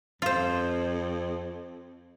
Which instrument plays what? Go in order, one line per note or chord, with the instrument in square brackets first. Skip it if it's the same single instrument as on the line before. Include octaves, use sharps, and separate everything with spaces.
[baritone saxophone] F2 [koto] F4 C5